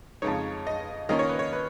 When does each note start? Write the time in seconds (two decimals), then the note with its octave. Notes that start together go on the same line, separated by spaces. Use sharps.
0.22 F2 C#3 G#3 D#4 C#5
0.67 D#5
1.09 D#3 A#3 C#4 F4 D#5
1.19 C#5
1.29 B4
1.39 C#5
1.53 B4